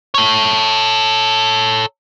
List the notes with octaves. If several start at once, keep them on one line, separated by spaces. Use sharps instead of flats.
A4 C#5